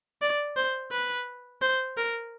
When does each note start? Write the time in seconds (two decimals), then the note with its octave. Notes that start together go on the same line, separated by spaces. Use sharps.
0.22 D5
0.56 C5
0.92 B4
1.62 C5
1.97 A#4